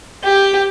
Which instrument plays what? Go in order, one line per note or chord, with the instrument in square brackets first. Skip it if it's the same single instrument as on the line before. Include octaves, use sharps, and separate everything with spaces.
[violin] G4